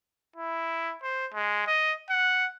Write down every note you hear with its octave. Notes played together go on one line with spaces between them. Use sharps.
E4
C5
G#3
D#5
F#5